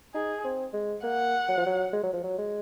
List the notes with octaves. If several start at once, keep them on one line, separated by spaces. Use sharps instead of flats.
D#4 G#4
C4
G#3
A#3 F#5
F#3
F3
F#3
G#3
F#3
F3
F#3
G#3